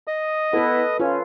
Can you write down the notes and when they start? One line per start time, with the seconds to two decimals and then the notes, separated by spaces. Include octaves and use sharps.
0.07 D#5 D#6
0.53 B3 E4 A4 B4
1.00 C#4 F4